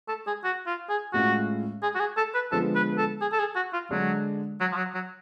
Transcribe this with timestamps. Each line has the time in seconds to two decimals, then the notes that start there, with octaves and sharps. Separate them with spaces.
0.08 A4
0.27 G#4
0.44 F#4
0.67 F4
0.89 G#4
1.13 A2 G#3 C#4 F4 F#4
1.82 G#4
1.95 F#4
2.00 G#4
2.17 A4
2.34 B4
2.52 D3 F3 G#3 B3 A4
2.75 B4
2.98 A4
3.21 G#4
3.33 A4
3.40 G#4
3.56 F#4
3.73 F4
3.90 D3 F#3 G#3 D4
4.61 F#3
4.72 F3
4.77 F#3
4.95 F#3